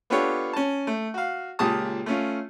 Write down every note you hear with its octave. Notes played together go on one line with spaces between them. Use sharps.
B3 D4 F4 G4 A4 C#5
C#4 A5
A3
F#4 F5
C#2 A#2 G4 G#4 A5 D#6
A3 C#4 F4